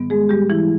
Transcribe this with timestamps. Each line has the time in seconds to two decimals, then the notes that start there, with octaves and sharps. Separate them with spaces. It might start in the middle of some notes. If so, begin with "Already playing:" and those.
Already playing: G#2 D#3 G3 B3
0.10 G#3 G#4
0.29 G3 G4
0.50 E3 E4